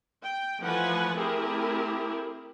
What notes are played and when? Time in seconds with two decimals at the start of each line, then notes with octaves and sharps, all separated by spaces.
0.22 G5
0.60 E3 F3 A3 B4 F#5 G#5
1.15 A3 C4 E4 G4 G#4 A#4